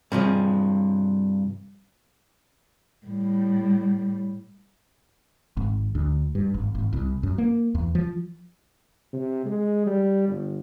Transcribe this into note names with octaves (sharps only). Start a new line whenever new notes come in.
G2 C3 F3 G#4
A2 G3
G#1
D2
G2
G#1
G#1
C2
F#2
A#3
E2
F3
C3
G#3
G3
G1